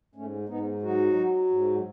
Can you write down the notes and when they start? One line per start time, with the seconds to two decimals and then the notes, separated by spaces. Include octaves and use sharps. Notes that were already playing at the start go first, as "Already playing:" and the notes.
0.15 G#2 A3 C#4
0.48 G#2 B3 D#4
0.82 F#3 D#4 F#4
1.16 F#3
1.50 G#2